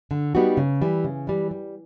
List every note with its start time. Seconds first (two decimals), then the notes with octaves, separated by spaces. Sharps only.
0.11 D3
0.35 G3 B3 D#4 F#4
0.57 C#3
0.82 E3 G3
1.04 C#3
1.27 E3 G3
1.51 G3